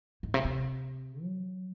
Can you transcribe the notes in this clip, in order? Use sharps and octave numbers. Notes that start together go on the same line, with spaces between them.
G#2
C3
C3
F#3